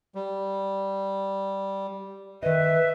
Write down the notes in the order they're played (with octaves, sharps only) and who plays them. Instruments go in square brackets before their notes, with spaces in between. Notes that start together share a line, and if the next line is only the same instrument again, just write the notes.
[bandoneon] G3
[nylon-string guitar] D#3 D#5 [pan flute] B4 [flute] E5